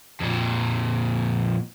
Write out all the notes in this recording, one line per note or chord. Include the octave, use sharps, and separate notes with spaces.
F2 A#2